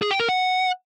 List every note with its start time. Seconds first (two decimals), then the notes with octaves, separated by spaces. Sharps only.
0.02 G#4
0.11 G5
0.20 A#4
0.29 F#5